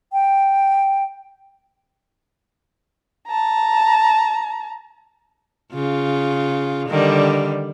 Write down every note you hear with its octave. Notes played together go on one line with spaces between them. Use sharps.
G5
A5 A#5
C#3 F4
D3 D#3 G3